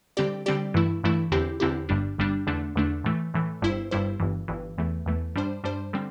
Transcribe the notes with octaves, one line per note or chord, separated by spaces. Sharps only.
D3 G3 C4 G4 D5
D3 G3 C4 G4 D5
G2 E3 A3 E4
G2 E3 A3 E4
E2 D3 C4 E4 G4
E2 D3 C4 E4 G4
G1 G2 G3 D4
G1 G2 G3 D4
E2 D3 A3 D4
E2 D3 A3 D4
A2 E3 A3
A2 E3 A3
G1 G2 G3 E4 C5
G1 G2 G3 E4 C5
G1 G2 E3
G1 G2 E3
E2 E3 A3
E2 E3 A3
G2 G3 D4 C5
G2 G3 D4 C5
D3 G3 C4